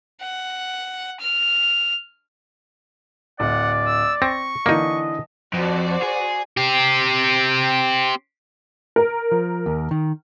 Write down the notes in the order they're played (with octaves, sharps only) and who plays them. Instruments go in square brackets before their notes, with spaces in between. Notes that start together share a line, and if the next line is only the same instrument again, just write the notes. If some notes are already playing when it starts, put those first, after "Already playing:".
[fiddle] F#5
F6
[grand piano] D1 [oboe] D5 [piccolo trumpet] F#5
[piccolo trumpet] E6
[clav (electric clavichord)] C4 [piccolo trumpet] C#6 [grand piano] A#6
[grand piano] D3 E3 [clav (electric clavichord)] A#3 D#4 [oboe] D#5
[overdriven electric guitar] F2 [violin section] F#4 C5 D5
[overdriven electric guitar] G#4
[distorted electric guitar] C4 G4
[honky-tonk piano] A#4
[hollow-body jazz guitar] F3
D#2
D#3